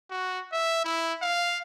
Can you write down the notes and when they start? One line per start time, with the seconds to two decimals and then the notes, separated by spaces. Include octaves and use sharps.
0.11 F#4
0.52 E5
0.84 E4
1.22 F5